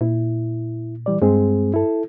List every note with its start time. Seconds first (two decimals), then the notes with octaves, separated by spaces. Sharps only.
0.01 A#2 E4
1.06 E3 G3 D5
1.22 G2 G#3 C4 G#4
1.74 E4 A4